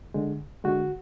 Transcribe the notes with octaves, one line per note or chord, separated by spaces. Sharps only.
D3 G#3
D3 G#3 F#4